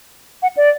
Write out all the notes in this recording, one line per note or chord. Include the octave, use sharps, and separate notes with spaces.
F#5
D5